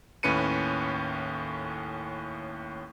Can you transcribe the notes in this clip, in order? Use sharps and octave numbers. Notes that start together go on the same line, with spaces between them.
D#2 A2 C#4 B4 C#7 D#7